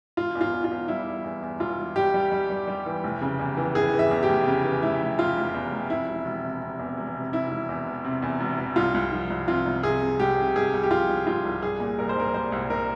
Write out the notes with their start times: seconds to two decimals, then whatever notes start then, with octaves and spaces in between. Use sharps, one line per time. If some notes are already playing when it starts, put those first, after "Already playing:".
0.17 E1 F4
0.35 E2
0.41 F4
0.53 E2
0.64 F4
0.71 E2
0.88 G3 E4
1.07 E2
1.24 E2
1.42 E2
1.60 E1 F4
1.78 E1
1.96 G3 G4
2.14 G3
2.32 G3
2.50 G3
2.68 G3
2.86 E3
3.04 F1
3.22 C#3
3.39 E2
3.57 E3
3.75 E3 G#4
3.93 E3
3.99 E5
4.11 E2
4.23 G4
4.29 F1
4.47 C#3
4.64 E3
4.83 F1 E4
5.00 F1
5.18 F1 F4
5.36 F1
5.54 E2
5.72 F1
5.90 C3 E4
6.08 E1
6.25 E1
6.43 C3
6.62 C3
6.79 E2
6.97 E1
7.15 C3
7.33 C3 E4
7.51 E1
7.69 E2
7.87 E1
8.04 C3
8.22 E2
8.41 E1
8.58 E1
8.76 C2 F4
8.94 C2
9.12 F3
9.30 C2
9.48 C3 F4
9.65 C2
9.83 C3 G#4
10.02 C3
10.20 C2 G4
10.37 C3
10.55 C2 G#4
10.73 C2
10.83 G4
10.91 F3 F4
11.09 C2
11.27 C2 F4
11.45 C2
11.62 G3 G#4
11.80 A#2
11.98 C2 A#4
12.09 C5
12.16 C2 A#4
12.34 G3 C5
12.52 C2
12.70 C2 A#4